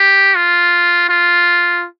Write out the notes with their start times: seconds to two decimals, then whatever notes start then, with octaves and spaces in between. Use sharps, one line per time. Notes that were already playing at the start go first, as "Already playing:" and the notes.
Already playing: G4
0.35 F4
1.09 F4